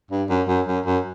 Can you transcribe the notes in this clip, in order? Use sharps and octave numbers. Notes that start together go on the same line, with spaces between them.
G2
F#2
F#2
F#2
F#2